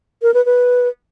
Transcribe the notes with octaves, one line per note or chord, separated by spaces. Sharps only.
A#4
B4
B4